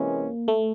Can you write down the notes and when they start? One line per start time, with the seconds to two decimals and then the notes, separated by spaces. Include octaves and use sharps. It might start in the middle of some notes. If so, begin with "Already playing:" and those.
Already playing: C3 E3 G#3 A#3 C#4
0.48 A3